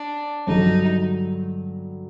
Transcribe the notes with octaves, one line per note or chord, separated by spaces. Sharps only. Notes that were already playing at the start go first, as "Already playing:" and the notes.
Already playing: D4
G2 D3 F#3 D#4